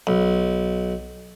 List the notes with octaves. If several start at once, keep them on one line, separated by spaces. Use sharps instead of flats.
B1